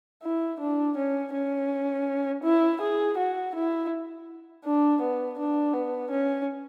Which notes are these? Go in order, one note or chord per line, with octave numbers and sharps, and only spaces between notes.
E4
D4
C#4
C#4
E4
G#4
F#4
E4
D4
B3
D4
B3
C#4